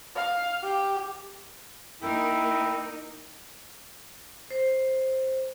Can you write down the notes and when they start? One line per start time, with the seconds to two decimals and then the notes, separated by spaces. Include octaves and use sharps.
0.16 F5
0.63 G4
2.02 A#3 D#4 E4 A#4 G5
4.50 C5